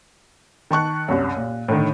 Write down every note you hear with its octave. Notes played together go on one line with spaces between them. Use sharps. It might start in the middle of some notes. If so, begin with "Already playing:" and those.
D#3 A5 C#6 F#6
C2 F#2
A#2
A2 D3 D#3